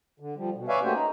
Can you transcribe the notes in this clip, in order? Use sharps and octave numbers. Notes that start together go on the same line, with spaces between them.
D3
F3 G3
B2
B4 C#5 D5 E5 F5 G#5
A3 A#3 C#4 F#4 G4 C5
D#4